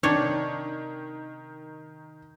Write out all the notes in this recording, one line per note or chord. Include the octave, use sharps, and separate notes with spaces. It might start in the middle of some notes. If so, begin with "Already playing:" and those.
C3 D#3 D4 C#5